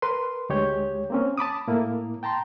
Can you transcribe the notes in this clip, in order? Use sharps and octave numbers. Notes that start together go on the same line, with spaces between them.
A#4 B4 C6
D2 G#3 G4 C#5 G6
A#3 C4 C#4
A5 B5 D6 D#6
A2 A#3 E4
G5 A5 A#5 C6